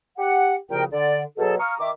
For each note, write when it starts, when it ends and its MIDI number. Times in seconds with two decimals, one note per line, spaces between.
0.18 0.55 67
0.18 0.55 78
0.70 0.85 36
0.70 0.85 46
0.70 0.85 49
0.70 0.85 53
0.70 0.85 70
0.70 0.85 79
0.92 1.22 50
0.92 1.22 74
1.38 1.56 47
1.38 1.56 54
1.38 1.56 68
1.38 1.56 69
1.59 1.74 77
1.59 1.74 82
1.59 1.74 85
1.59 1.74 87
1.59 1.74 89
1.80 1.90 51
1.80 1.90 76
1.80 1.90 86